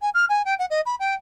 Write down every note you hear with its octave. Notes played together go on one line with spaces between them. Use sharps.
G#5
F6
G#5
G5
F#5
D#5
B5
G5